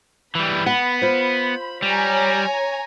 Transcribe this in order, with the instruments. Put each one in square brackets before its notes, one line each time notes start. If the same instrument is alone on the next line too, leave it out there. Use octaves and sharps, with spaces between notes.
[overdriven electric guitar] E3 G3 [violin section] B5
[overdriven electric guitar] B3 [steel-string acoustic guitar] F#5
[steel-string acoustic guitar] F4 C5
[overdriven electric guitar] G3 [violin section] C#5 G#5 A#5